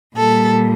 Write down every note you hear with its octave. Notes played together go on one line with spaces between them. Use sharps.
A#2 G3 A4